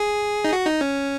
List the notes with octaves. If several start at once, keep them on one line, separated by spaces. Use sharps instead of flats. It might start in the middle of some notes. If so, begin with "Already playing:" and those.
Already playing: G#4
D#4
F#4
D#4
C#4